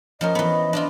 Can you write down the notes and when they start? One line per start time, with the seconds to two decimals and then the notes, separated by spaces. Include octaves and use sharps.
0.21 F3 C#4 A#4 D#5
0.35 E3 B3
0.73 D4 E4 F4